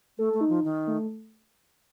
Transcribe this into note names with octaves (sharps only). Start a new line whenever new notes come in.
A3 A4
A3
D#4
F3
D#3
A3